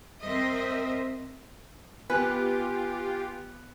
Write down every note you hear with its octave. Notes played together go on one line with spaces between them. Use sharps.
C4 A#4 C5 D#5 E5
B3 F4 G4 B4 G#5 F#6